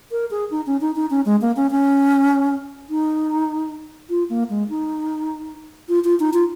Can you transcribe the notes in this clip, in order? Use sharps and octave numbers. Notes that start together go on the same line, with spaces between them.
A#4
G#4
D#4
C#4
D#4
D#4
C#4
G#3
A#3
C#4
C#4
D#4
F4
A#3
G#3
D#4
F4
F4
D#4
F4